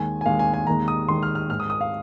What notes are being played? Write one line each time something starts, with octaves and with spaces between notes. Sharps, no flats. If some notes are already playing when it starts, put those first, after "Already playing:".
Already playing: D#2 D#3 G#3 G#5
G#5
D#2 D#3 G#3 F5
G#5
G#5
D#2 D#3 G#3 A#5
D#6
D#2 D#3 G#3 C6
F6
F6
G#2 G#3 F6
D#6
D#6
F5